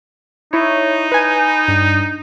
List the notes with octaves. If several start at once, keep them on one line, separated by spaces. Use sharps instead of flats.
D#4 E4 C#5
B4 G#5
G2